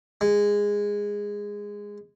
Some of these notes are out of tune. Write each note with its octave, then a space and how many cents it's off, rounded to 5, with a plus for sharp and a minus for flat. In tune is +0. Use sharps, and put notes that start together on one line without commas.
G#3 -15